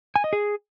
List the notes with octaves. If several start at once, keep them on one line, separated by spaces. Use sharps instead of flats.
G#5
D#5
G#4